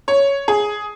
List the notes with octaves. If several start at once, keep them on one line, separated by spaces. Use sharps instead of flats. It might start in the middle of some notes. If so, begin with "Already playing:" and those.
C#5
G#4